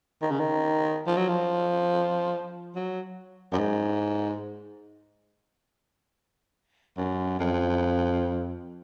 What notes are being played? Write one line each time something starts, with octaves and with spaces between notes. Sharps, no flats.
D#3
C#3
D#3
F3
F#3
F3
F#3
F#2
G#2
F#2
F2